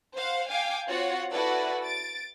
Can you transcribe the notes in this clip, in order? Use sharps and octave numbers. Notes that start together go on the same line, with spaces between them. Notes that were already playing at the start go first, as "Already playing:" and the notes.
C5 F5 F#5
F5 G5 G#5 D6
C4 F4 F#4 C#5 F#5
E4 F#4 A4 B4 D5 F#5
A6 D7